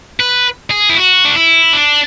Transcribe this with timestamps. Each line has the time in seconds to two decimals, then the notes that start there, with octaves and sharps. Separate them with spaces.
0.20 B4
0.71 G#4
0.90 E4
0.97 F#4
1.25 D4
1.36 E4
1.73 D4